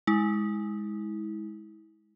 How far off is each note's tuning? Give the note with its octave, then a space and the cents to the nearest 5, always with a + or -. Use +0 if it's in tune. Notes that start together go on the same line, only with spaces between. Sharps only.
G#3 +0 E4 -30